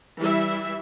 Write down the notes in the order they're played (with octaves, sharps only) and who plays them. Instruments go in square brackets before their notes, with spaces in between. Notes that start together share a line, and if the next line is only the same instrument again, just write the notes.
[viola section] E3 G3 E4 E5